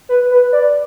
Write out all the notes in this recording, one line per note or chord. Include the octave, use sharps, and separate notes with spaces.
B4
B4
D5